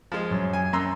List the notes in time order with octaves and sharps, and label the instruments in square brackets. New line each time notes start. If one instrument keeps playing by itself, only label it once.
[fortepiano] F3 G#3
[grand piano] F#2
[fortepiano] G#5
[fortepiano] F#2 C6 E6 [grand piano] A#5